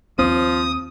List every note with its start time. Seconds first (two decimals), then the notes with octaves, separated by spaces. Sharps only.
0.19 D#2 F3 C4 D#6